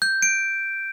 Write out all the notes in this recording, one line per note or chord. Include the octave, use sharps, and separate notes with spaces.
G6
D7